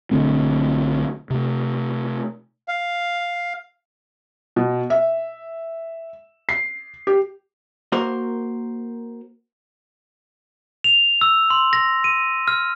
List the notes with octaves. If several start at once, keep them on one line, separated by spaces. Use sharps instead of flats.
B1 D3 A3 C4
C3 A3
F5
B2
E5
C7
G4
A#3 F#4 A#4 C5
F7
E6
C6
A#6
D#7
F6